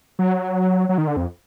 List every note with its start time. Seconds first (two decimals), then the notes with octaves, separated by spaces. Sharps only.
0.19 F#3
0.89 F#3
0.98 D#3
1.07 D3
1.16 F2